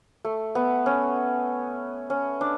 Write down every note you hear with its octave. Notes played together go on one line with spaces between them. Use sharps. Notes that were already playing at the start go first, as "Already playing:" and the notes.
A3
B3
C#4
C#4
D4